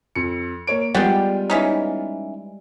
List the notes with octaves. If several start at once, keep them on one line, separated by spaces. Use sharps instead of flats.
F2 C#7
A#3 C#5 D7
G3 G#3 B3 F4 D5 F#5 G5
E3 C#4 D#4